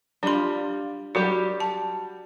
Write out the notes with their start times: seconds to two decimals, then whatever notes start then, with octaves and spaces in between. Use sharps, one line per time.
0.23 G3 D4 F4 C6
1.15 F#3 G3 F#4 G4
1.60 A5